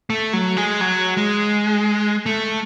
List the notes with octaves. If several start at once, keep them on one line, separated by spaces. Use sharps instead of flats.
A3
F#3
G#3
F#3
G#3
A3